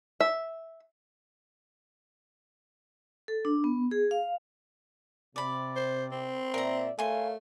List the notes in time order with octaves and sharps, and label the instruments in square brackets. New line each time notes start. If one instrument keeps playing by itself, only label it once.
[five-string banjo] E5
[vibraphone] A4
D4
B3
G#4
F5
[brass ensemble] C3 [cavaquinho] D5 B5
[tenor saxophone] C5
C4
[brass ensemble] A#2 D5 E5 [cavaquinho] A#4 A#5
[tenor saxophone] A3 [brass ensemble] A#4 C#5 F5 [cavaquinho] G#5 C6